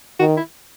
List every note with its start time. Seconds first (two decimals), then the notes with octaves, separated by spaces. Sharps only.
0.20 D#3 F#4
0.37 E4